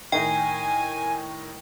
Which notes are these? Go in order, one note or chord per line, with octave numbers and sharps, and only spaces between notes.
A2 D#3 D#4 G5 G#5